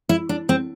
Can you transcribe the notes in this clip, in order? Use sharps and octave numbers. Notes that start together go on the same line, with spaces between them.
E4
D4
C4